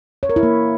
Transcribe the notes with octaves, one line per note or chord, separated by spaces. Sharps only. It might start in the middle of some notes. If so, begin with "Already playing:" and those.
C#5
A#4
E4
A#3